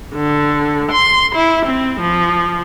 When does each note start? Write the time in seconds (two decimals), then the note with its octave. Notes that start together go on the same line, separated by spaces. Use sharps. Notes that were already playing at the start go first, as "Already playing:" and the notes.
0.15 D3
0.91 C6
1.35 E4
1.65 C4
2.00 F3